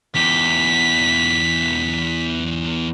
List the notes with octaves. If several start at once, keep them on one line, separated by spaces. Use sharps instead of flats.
E2 G4 B6